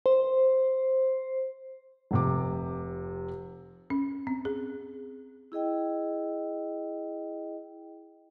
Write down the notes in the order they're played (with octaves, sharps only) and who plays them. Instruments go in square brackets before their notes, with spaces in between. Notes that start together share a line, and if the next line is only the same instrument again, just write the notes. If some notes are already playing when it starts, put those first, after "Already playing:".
[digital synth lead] C5
[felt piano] F1 C3 D6
[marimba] C#4
C4
G#4
[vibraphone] E4 G#4 D#5 G5